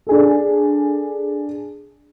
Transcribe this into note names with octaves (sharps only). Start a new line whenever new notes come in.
D4 G#4 A4